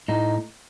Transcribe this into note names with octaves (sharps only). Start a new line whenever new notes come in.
A2 D#4